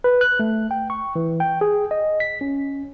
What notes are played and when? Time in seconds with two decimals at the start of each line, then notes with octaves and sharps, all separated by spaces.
0.04 B4
0.21 F#6
0.39 A3
0.71 G5
0.90 C#6
1.16 E3
1.40 G5
1.61 G#4
1.91 D#5
2.20 B6
2.41 C#4